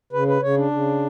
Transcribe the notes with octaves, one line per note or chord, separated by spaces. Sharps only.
C#3 B4
B4
C#3 C#5
D4
C#3